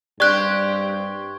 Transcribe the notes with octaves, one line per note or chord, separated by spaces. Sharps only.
G2 C4 G4 D5 C#6 F#6 G#6 G7